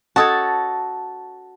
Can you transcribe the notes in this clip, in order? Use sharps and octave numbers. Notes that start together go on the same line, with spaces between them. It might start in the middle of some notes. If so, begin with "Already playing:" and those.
C#4 F#4 A4 C#5 D#5 A5 D#6